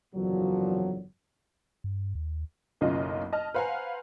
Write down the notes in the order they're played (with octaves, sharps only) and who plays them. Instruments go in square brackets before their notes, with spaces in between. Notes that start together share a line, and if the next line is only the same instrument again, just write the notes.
[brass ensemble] F#1 E2 A#2 D3 F3 F#3
[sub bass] G2
D#2
[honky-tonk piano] F#1 B1 C#3 F4 D#5
D#5 A5 F6
B4 C5 F5 F#5 G#5 A#5